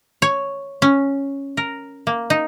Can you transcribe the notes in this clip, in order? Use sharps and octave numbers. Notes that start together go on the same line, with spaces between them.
C#5
C#4
A#4
A#3
D#4